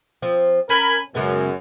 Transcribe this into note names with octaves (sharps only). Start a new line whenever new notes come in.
F3 C4
C#4 A#4 G#5 B5
F#2 C#3 G#3 B3